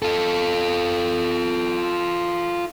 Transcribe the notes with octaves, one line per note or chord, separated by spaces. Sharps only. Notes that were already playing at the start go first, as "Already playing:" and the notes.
F4 A4